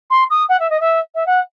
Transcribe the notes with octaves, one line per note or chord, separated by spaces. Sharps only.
C6
D#6
F#5
E5
D#5
E5
E5
F#5